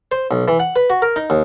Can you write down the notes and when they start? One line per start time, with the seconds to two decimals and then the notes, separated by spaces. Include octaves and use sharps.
0.12 C5
0.31 B1
0.48 E3
0.60 F#5
0.76 B4
0.90 F#4
1.02 A#4
1.16 D#4
1.30 D#2